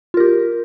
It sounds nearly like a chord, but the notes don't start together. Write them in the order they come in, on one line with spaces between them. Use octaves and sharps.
F4 A#4 G4